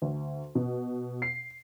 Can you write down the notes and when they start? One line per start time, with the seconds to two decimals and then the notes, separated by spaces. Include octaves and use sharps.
0.02 D2
0.55 B2
1.22 C7